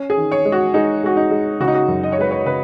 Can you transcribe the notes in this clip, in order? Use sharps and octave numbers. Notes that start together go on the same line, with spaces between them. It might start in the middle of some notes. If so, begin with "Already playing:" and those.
Already playing: C#4
G#4
D#3
C#5
G#3
F#4
G#3 D#4
G#3 F#4
D#4
G#3
C#3 F#4
D#4
F#4
F#2
D#5
C#5
G#3 B4
C#5
C#3 B4